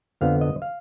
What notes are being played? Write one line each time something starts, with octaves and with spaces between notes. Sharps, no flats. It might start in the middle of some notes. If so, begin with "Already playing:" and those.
F2 D3 F3 B3 F5
D#5
F5